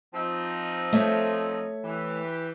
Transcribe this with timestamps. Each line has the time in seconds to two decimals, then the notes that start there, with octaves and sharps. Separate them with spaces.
0.14 F3 C4 D#4
0.93 A3 C#5 E5
1.84 E3 G4